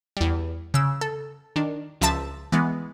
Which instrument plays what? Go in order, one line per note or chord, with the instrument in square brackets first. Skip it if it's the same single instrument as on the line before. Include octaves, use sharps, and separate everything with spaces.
[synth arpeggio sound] E2 G3
C#3 E6
A4
D#3 D4
C#2 F3 E5 A5 A6
E3 G#3 B3